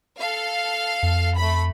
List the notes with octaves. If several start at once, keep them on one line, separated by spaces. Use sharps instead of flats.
A4 F5
F2
A3 B5